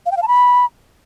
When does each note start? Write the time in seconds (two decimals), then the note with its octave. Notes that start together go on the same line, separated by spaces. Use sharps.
0.06 F5
0.11 G5
0.17 F5
0.22 A5
0.28 B5